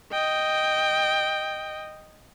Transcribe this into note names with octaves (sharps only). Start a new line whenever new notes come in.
D#5 G5